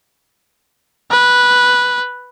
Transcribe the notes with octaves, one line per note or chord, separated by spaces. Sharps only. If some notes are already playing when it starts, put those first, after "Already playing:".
B4